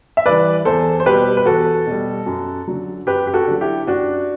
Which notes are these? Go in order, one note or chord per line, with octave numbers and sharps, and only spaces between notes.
E5
E3 G3 B4 D5
E2 A4 C5
C5
B2 G3 G4 B4
B4
E2 F#4 A4
B2 G3
F#2
D3 F#3
F#2 G4 B4
G4
F#4 A4
D3 F#3
E4 G4
F#2 D4 F#4